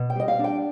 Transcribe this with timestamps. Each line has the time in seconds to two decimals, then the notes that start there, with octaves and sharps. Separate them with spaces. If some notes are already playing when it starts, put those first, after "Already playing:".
Already playing: B2
0.10 G5
0.16 G3 D#5
0.28 F5
0.39 D4
0.44 G5